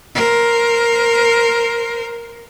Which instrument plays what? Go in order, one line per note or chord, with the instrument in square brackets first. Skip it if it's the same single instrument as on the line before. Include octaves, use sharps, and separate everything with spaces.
[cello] A#4 C5